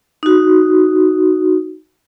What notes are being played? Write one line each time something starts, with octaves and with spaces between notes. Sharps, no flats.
D#4 F#4